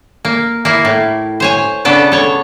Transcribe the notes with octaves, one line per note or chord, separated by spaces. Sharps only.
A#3
A#3 E4
A2
C5 C#5 G#5
C#3 B3 D4 A4
A4 C#5